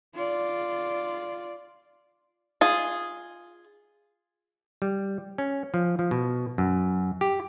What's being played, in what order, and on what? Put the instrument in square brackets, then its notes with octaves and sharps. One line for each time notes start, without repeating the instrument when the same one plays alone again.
[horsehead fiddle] F4 D5
[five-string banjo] F4 G#4
[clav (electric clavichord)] G3
C#4
F3
F3
B2
F#2
G4